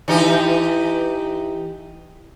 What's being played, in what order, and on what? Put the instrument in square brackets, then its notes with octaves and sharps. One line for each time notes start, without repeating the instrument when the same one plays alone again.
[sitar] E3 D#4 G4